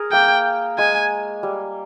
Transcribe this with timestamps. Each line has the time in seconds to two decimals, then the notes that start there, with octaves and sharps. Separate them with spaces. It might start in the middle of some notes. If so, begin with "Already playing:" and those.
Already playing: G#4 A#4
0.12 A#3 G5
0.78 G#3 G#5
1.43 G3